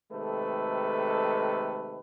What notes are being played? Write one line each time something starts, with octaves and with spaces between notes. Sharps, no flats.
C3 D#3 G#3 A3 A4 B4